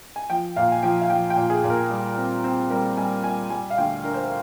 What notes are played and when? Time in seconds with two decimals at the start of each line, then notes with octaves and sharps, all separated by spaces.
0.16 G#5
0.30 F3 G5
0.56 A#2 F5
0.72 G#5
0.83 F3 G5
1.01 F5
1.10 F3 G5
1.30 G5
1.36 A#2
1.50 G#4
1.64 A#2
1.70 A#4
1.90 G3
2.18 C4
2.44 C4
2.70 G3 A#4
2.97 G3 G#5
3.24 G3 G#5
3.50 G3 G#5
3.70 F5
3.78 D2 G5
4.04 D4 A#4
4.14 C5
4.25 A#4